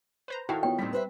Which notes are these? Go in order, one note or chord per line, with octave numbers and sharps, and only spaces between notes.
B4 C5 A#5
D#3 E4 F#4 A4 F5 G5 A5
B3 F4 C#5 G5
D#2 A2 D#3 G3 C4 B6
B4 C5 E5